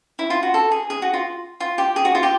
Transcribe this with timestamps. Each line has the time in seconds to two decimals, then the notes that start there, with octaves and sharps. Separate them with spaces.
0.19 E4
0.30 F4
0.43 F#4
0.54 A4
0.71 G#4
0.90 G#4
1.02 F#4
1.13 F4
1.60 F4
1.78 G4
1.96 G#4
2.05 F#4
2.15 F4
2.23 G4